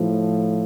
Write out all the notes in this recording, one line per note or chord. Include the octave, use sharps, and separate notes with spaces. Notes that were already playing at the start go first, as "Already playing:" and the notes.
Already playing: A2 F3